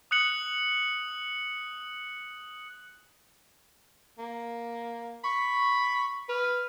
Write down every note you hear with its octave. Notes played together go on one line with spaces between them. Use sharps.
D#6 F#6 C#7 F#7
A#3
B5 C#6
B4 F6